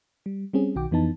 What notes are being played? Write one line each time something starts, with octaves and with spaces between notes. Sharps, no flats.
G3
G3 C4 C#4 G#4
B1 D#3 F#4 G5 D6
F2 E3 B3 D#4 A5